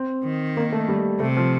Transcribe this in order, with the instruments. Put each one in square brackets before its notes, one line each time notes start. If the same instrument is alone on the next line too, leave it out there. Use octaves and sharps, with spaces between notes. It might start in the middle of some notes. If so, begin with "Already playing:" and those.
Already playing: [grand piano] C4
[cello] D#3
[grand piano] A#3
A3
G3
[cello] C3 [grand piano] A3
[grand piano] F3